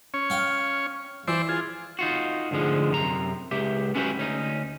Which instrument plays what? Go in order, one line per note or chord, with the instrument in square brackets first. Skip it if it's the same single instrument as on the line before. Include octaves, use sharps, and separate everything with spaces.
[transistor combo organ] C#4 C#5
[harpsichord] F5 G5
[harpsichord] E3 [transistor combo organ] C5 D5 E5
[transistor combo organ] F4 G#4
[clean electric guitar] D#4 F4 F#4
D2 G#2 D3 F3 G#3
F#2 C3 A#5
C#2 G4 E5
B3 C#4 E4 F#4 G4 B4
D2 C#4 D#4